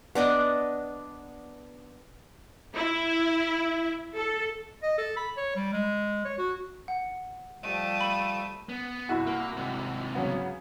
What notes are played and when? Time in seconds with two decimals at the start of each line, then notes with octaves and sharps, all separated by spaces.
0.15 B3 D4 D5 D#5
2.75 E4
4.16 A4
4.83 D#5
4.98 A4
5.17 B5
5.37 C#5
5.56 G3
5.73 G#3
6.25 C#5
6.38 F#4
6.88 F#5
7.63 F3 G3 A3 D#6
8.01 B5
8.69 B3
9.09 C2 E4 F#4
9.27 A#3
9.57 G#2 C3
10.15 C#3 F#3 B3